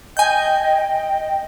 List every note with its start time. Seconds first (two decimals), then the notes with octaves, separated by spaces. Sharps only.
0.17 D#5 G5 G#5 G6
0.77 D#5